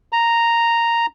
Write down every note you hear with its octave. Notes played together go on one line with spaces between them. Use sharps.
A#5